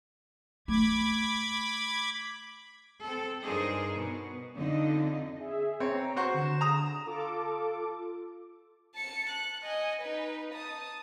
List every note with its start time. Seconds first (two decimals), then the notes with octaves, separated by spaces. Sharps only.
0.68 A3 B5 D6 G#6
3.03 C4 A4
3.43 G2 D4 D#4 G#4 A#4 C5
3.93 B2
4.56 F2 D3 D4 D#4 D#5
5.39 G#4 E5
5.80 C4 C#5 A#5
6.16 F#4 C5 C#6
6.34 D3 E7
6.61 A#5 D#6
7.06 F4 A4 D6
8.95 A5 C#7
9.30 F#6
9.62 D#5 G#5
10.01 D#4 B4
10.53 A5 D#6